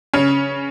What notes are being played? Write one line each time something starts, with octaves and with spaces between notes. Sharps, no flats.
C#3 C#4